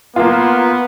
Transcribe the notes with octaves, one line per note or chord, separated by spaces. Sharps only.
A#3 B3 F4